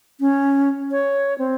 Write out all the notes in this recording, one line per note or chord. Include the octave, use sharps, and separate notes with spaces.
C#4
C#5
C4